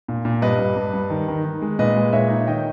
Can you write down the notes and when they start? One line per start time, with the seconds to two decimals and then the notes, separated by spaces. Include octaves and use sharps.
0.08 A#2
0.25 A#2
0.42 G2 B4 D#5
0.59 G2
0.77 G2
0.93 G2
1.10 D#3
1.28 D#3
1.45 D#3
1.62 G#3
1.79 A#2 B4 D#5
1.96 G#3
2.13 A#2 C#5 E5
2.30 D#4
2.47 D#3 D#5 G5